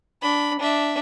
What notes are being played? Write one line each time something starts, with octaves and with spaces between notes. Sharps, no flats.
D4 B5
D4 E5